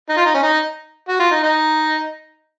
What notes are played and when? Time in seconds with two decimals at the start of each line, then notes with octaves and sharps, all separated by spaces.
0.09 D#4
0.17 F4
0.26 D#4
0.34 C#4
0.43 D#4
1.08 F#4
1.20 F4
1.31 D#4
1.43 D#4